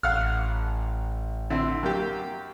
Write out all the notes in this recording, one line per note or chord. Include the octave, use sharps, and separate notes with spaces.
A1 F5 F#5 F6
D3 C4 E4
F#2 A#3 G4